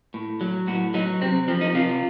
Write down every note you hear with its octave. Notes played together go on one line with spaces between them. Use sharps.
A2
F#3
A2 F#4
F#3 D#4
C3 C4
F3 C4
D#4
C3 F4